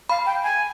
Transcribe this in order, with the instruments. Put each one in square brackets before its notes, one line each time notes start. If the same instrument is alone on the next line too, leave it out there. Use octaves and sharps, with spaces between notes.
[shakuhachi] F5 [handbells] B5
[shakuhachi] G5
G#5